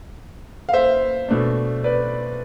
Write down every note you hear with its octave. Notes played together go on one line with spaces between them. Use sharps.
F5
C5 E5
B2 A3 D4
B4 D5